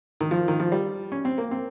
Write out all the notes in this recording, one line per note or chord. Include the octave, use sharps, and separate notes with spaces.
D#3
F3
D#3
F3
G3
C#4
C4
A#3
C4